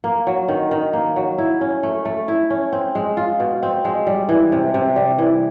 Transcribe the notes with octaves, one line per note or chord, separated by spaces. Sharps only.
A#3
F#3
D#3
D#3
A#3
F#3
E4
C#4
A3
A3
E4
C#4
C4
G#3
F4
B2
C4
G#3
G3
E3
C3
C3
G3
E3